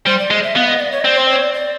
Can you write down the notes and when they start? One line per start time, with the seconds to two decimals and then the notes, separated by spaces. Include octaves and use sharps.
0.06 G3 C5
0.19 D5
0.31 G#3 D#5
0.43 E5
0.55 B3 F5
0.68 D#5
0.80 D5
0.92 C#5
1.00 D#5
1.04 C4 D5
1.17 C5
1.29 C#5
1.42 D5
1.54 D5